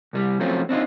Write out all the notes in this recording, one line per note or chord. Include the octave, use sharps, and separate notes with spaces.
C2 G3
F3 F#3 A3 C4 C#4 F4
C4 D4 D#4 F4